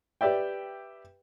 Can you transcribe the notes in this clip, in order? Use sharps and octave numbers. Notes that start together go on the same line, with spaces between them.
G4 B4 D5 E5 G5